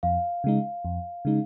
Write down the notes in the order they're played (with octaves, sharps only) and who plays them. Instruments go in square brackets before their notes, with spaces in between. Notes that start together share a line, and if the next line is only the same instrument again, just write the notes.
[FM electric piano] F2 [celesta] F5
[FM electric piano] C#3 G#3 D#4
F2
C#3 G#3 D#4